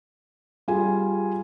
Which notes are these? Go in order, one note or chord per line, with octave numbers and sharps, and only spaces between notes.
G3 F4 G#4 G#5